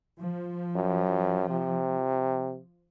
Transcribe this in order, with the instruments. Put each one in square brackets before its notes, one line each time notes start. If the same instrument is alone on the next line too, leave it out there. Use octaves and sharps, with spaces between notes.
[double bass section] F3
[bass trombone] F#2
C3